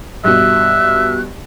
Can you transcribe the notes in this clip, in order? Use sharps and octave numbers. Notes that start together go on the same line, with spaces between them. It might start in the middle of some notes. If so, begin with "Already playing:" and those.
G2 B2 E5 F#6